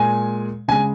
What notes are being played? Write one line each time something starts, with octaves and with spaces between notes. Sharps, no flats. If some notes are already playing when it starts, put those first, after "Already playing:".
Already playing: A#2 G#3 G#5
C#3 G#3 G#5